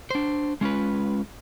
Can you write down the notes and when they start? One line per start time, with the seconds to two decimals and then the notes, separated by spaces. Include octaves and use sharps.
0.10 D4 C5
0.61 G#3 C#4 F4 B4